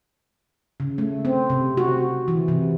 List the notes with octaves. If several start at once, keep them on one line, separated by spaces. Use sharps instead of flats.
C#3
A3
C4
C3
F#4
E3
C3